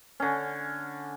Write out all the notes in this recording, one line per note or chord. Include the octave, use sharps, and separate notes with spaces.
D3 C#4